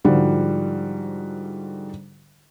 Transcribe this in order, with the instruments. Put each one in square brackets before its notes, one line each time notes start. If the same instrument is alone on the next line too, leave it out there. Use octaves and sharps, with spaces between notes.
[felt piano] G#2 D3 F3 G3 F4 F#4